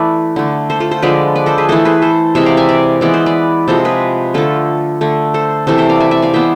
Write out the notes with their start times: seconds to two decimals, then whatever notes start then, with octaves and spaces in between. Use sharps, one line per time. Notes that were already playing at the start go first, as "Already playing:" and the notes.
Already playing: E3 A3 B4 D5
0.36 D3 A3
0.70 A4 C5
0.80 F4 A4
0.91 A4 C5
1.02 D3 F3 G#3 B4 D5
1.35 B4 D5
1.46 A4 C5
1.58 G#4 B4
1.69 E3 A3 A4 C5
1.85 G#4 B4
2.02 A4 C5
2.35 C3 E3 G#3 C5 E5
2.46 D5 F5
2.57 E5 G#5
2.69 D5 F5
3.01 E3 G#3 B3 D5
3.14 C5
3.26 B4 D5
3.68 C3 F3 G#3 A4 C5
3.85 G#4 B4
4.34 D3 A3 F4 A4
5.01 D3 A3
5.34 A4 C5
5.67 C3 E3 A3 A4 C5
5.78 C5 E5
5.89 D5 F5
6.00 E5 G#5
6.11 E5 G#5
6.22 D5 F5
6.33 E3 G#3 B3 C5 E5